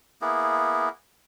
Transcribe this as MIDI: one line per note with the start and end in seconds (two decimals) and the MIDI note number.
0.22 0.89 58
0.22 0.89 59
0.22 0.89 64
0.22 0.89 68